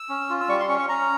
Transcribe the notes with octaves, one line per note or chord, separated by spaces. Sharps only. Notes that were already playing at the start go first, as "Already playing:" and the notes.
Already playing: E6
C#4
F4
E6
G3 C#6
C6
C#4 C#6
C#6
C#4 A#5